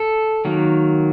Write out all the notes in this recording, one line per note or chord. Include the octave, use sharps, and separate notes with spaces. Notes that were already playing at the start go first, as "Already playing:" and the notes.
Already playing: A4
D#3 F#3 A#3